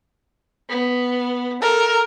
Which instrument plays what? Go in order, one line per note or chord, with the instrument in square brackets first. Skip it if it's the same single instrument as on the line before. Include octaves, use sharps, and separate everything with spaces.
[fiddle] B3
[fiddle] A4 [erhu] A#4